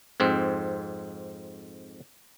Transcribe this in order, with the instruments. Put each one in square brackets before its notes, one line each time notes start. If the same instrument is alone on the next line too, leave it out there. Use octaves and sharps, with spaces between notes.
[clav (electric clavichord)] F2 G#2 C4